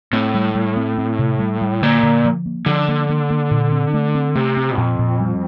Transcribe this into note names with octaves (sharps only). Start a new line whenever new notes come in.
A2 C4
G3
G3
C4
C4
C3
G3
G3
A#2 D3
D3
F3
A#3
D3 F3
A#3
A#3
A#3
A#2
C4
A3
C4
C3 A3
C4
F2 A#2
A#2
G3